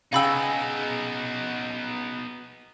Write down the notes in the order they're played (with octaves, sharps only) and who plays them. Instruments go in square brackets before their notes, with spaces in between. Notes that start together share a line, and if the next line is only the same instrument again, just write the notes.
[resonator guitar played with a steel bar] C#3 G#4 G5 [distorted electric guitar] B3 D#4 [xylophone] F5 B5 E6